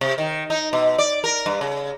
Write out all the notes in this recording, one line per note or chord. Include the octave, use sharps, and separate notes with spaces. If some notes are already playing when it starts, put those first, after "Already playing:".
C3
D#3
D#4
B2
D5
A#4
G2
C#3